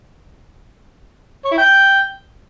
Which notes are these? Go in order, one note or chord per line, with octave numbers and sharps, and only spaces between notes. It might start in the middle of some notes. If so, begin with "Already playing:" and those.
C#5
E4
G5